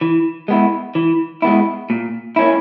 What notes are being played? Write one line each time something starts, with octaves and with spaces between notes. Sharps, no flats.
E3
G#3 B3 E4
E3
G#3 B3 E4
A#2
A#3 C#4 E4